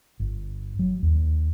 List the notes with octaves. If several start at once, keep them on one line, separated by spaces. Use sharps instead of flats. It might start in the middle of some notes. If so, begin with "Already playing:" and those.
G1
F#3
D#2